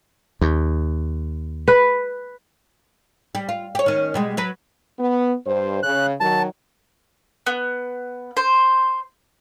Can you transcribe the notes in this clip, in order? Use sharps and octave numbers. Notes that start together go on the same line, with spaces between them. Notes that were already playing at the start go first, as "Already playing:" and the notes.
D#2
B4
G3
F4
G4 C#5
D#3 C#4
B2 G3 G#3
F#3 B4
B3
G2 C5
C#3 F#6
D#3 F#3 A5
B3
C5